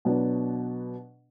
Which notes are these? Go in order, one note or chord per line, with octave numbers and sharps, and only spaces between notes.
B2 F#3 B3 D4